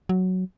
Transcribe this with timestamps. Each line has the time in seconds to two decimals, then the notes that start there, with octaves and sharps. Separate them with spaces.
0.09 F#3